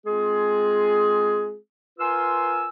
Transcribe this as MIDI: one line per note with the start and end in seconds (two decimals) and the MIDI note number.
0.06 1.56 56
0.06 1.56 60
0.06 1.56 65
0.06 1.56 68
1.99 2.67 65
1.99 2.67 70
1.99 2.67 71
1.99 2.67 80
1.99 2.67 84
1.99 2.67 88